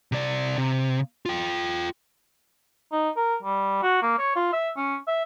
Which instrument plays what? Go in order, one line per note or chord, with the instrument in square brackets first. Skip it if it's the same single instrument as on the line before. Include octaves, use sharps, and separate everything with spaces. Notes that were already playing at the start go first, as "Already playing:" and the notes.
[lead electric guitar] C3 D5
C3
F4 G5
[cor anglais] D#4
A#4
G3
F#4
A#3
C#5
F4
E5
C#4
E5